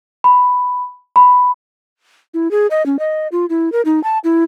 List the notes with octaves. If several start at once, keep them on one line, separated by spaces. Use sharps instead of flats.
B5
B5
E4
G#4
D#5
C#4
D#5
F4
E4
A#4
D#4
A5
E4